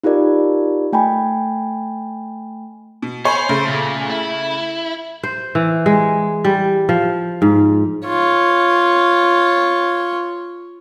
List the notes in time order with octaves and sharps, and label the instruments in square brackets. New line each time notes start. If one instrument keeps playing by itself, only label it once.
[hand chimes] D#4 F4 G4 A#4 D5
A3 G5 G#5 B5
[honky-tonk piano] B2
[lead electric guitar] C5 [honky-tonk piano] C#5 G#5 B5
[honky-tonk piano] C#3 A3
[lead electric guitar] A#2
E4
[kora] C5
E3
G#3
G3
F3
G#2
[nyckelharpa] F4 C#5